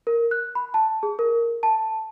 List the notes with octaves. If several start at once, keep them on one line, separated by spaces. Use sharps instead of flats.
A#4
F#6
B5
A5
G#4
A#4
A5